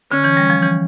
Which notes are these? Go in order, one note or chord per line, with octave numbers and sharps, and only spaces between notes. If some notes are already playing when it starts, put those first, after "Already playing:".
D3 C#4
E3
G3
F3
E3